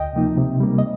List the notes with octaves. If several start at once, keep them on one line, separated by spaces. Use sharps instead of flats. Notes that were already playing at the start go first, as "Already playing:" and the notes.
Already playing: D2 D#5 G5
C3 F3 A#3 D#4
C3
G3 A#3
D#5